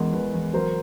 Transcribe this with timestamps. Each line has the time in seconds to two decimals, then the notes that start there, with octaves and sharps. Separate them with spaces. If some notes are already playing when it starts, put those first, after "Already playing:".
Already playing: E2 G#3 A#4
0.13 E2 B4
0.34 E2
0.53 F#3 A#4 C5